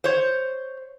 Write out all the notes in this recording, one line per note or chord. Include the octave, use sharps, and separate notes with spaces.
C5 C#5